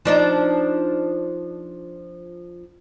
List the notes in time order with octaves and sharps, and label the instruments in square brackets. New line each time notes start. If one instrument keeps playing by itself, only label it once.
[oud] F3 D4 D#4